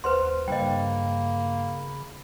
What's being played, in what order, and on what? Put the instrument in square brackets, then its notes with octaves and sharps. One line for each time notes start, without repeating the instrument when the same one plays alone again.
[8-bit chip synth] D#2 [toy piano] B4 C5 C6 [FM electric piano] F#5
[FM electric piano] G2 [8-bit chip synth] C#3 B5 [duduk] A#3 [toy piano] D#5 G5